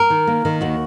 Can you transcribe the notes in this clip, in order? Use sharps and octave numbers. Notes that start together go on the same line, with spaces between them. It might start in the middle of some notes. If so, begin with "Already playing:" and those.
Already playing: A#4
D#3
A#3
D#3
D#2 F#4